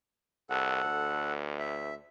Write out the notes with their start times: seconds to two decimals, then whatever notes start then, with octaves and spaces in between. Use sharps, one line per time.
0.50 C2 A4 F#5
0.84 D2
1.59 E5